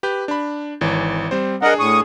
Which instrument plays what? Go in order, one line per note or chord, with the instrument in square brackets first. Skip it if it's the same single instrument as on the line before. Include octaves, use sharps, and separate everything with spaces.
[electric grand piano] G4 B4 G6
D4 B5
G#1 E3 C#5
G3 C4 C5
[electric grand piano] D4 G#4 [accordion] A#4 D#5 F#5
[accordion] A2 C#6 D#6